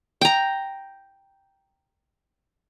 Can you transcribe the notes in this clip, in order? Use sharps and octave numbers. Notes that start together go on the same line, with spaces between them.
G5 A#5